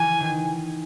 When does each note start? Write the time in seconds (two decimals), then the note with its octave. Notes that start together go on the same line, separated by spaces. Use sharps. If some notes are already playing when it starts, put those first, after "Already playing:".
Already playing: E3 G#5
0.20 D#3